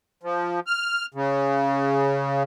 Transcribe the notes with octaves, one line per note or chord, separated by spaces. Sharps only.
F3
F6
C#3